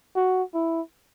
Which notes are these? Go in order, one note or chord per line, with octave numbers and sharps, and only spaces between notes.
F#4
E4